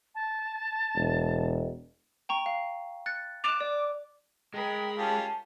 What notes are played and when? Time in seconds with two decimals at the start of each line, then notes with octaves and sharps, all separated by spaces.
0.15 A5
0.95 E1
2.29 G5 A#5 C#6
2.46 F5
3.06 F#6 A6 C#7
3.44 D6 F#6 E7 F7
3.61 D5
4.54 G#3 A#4 G5 B5
4.98 C#4 F4 G4 A5